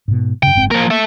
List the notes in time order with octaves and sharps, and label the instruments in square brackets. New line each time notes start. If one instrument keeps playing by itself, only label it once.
[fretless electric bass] G#2 B2
[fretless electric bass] F#2 C#3 [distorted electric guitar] G5
[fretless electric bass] F#1 G#2 C4
[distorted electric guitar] F3 A#4 [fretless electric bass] A#3
[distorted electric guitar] A4 E5